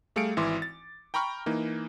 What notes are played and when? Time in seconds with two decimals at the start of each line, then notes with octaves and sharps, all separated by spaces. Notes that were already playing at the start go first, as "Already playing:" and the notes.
0.16 G3 A3 G#4 F5 C#7 D7
0.37 G#1 E3 E4 C6 D6
0.62 A6
1.14 G5 A#5 B5 C#6 F6
1.46 E3 A#3 D#4